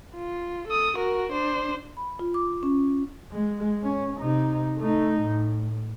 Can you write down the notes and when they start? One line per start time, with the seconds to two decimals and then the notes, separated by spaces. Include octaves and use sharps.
0.15 F4
0.67 A4 D#6
0.97 F#4 A#4
1.32 D4 C5
1.97 B5
2.19 F4
2.34 D6
2.63 C#4
3.32 G#3
3.83 C#4
4.20 C3 D#4
4.78 A3 D#4
5.21 A2